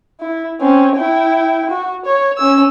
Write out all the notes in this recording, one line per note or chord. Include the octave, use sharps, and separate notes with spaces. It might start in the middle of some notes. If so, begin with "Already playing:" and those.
E4
C4 C#4
E4 G5
F#4
C#5
C#4 E6